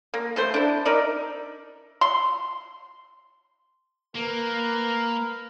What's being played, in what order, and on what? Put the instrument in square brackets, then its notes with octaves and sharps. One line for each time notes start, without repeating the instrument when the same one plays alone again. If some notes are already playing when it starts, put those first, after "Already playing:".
[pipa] A#3
E3 A3 C5
D4 E4
D#4 A#4 D5 E5
C6
[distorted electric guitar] A#3 [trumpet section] A#4 B4